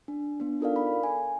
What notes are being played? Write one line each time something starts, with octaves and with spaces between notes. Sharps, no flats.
D4
B3 D4
D#4 F4 A4 A#4 D5 F5
B5
G#5